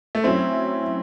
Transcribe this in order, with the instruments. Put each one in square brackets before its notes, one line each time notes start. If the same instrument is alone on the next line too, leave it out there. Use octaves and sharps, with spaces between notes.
[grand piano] A3
[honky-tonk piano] F#3 C#4 E4 [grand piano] C4